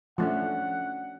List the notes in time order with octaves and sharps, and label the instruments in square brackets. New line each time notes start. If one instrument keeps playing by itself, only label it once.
[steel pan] F3 A3 [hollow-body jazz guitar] C#4 D4 F#4 [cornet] F#5